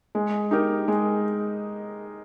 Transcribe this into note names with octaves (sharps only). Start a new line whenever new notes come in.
G#3
D#4 G4 A#4
G#3